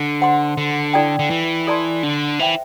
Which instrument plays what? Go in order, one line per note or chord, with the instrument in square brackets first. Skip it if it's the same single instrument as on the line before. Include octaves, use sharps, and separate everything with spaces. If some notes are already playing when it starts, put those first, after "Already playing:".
Already playing: [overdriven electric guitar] D3
[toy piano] C5 F#5 C6
[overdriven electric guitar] D3
[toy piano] E4 A4 D5 G5
[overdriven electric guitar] D3
E3
[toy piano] A4 D5 A5 C6
[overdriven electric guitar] D3
[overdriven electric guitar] E3 [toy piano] C5 E5 G5